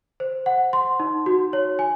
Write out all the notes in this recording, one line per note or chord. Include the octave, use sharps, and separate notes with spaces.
C5
F#5
C6
D#4
F#4
C#5
G#5